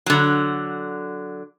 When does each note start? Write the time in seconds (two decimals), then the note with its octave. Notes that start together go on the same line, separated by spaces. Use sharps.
0.06 D3 F#3